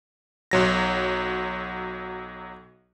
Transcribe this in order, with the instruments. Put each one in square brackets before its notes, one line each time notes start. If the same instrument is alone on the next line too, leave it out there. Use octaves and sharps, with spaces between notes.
[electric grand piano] B1 F#3 A#6